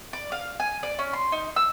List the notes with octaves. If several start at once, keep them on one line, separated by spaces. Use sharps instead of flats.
D5
F5
G#5
D5
C#4
C6
D#4
E6